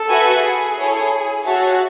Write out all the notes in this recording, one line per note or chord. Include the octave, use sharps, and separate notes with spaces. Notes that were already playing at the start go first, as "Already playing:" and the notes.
Already playing: A4
F#4 B4 E5 G#5
G#4
E4 A4 C#5
F#4 G#4 C#5 E5 A5